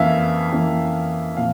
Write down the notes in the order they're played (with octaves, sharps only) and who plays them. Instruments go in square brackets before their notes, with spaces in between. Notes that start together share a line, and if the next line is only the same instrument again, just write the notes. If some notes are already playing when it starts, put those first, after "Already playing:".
Already playing: [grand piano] F2 E3 A#3 C#4 E5 F5
F2 E3 A#3 C#4
A#2 F3 C4 F5